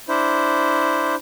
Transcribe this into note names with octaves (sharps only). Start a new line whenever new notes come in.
D4 E4 C5